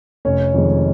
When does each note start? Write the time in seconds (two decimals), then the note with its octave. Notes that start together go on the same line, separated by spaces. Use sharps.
0.25 F1 C#4 C#5
0.54 F2 D#3 G#3